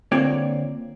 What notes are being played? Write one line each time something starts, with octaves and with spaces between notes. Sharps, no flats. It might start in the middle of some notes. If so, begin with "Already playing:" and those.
D3 A#3 C4 F4 C#5 D5